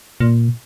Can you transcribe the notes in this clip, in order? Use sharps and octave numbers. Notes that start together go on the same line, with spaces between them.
A#2